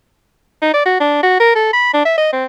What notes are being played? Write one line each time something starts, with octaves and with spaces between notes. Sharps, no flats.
D#4
D5
F#4
D4
F#4
A#4
A4
B5
D4
E5
D#5
C4